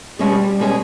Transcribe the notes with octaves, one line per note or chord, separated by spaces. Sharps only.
B2 G3 G#3 C#4 G#4
B2 G#3 C#4 G#4